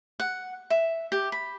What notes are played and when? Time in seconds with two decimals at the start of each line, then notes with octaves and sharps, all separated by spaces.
0.20 F#5
0.70 E5
1.12 G4
1.32 B5